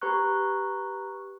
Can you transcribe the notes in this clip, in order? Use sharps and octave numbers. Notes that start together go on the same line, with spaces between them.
G4 B4 A#5 C#6 F#6